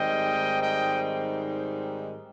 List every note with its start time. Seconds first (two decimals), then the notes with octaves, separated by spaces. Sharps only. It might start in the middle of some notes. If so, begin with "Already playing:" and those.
Already playing: G#2 D#3 G3 C4 D#4 D#5 G5
0.62 D#5 G5